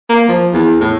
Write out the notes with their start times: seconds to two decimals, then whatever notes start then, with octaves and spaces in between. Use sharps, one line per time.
0.10 A#3
0.28 F3
0.53 E2
0.81 A2